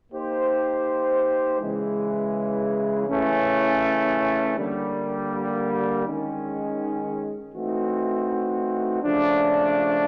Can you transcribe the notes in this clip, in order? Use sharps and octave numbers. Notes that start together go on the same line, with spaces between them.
A#3 D#4 G4 C5
C#3 E3 G#3
C#3 E3 A3 C#4
D3 G3 A#3
D#3 G#3 C#4
E3 A3 C4 D#4 F#4
C#3 F3 A3 D4